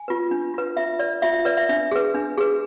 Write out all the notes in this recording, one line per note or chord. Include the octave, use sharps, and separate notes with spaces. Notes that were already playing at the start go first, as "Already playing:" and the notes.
Already playing: G#5
F4 B4
D4
F4 B4
F4 E5
B4 D5
F4 E5
E5
B4 D5
E5
D4 E5
G#4 B4
D4
G#4 B4